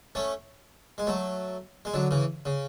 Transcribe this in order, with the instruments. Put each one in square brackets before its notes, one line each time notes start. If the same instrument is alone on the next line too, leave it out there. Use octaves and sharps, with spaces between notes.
[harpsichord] A3 C#4
G#3
F#3 A3
G#3
D3 F#3
C#3 E3
C#3